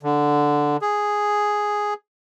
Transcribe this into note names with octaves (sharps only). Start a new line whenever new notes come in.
D3
G#4